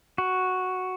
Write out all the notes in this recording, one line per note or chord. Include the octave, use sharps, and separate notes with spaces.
F#4